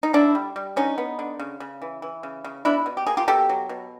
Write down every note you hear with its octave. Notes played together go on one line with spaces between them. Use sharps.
D#4
D3 D4 E4
G3
G3
D3 C#4 D#4
B3
D3
C#3
C#3
E3
E3
C#3
C#3
B2 D4 E4
B2
G4
A#3 G#4
F4 G4
B2 G4 A4
F#3
B2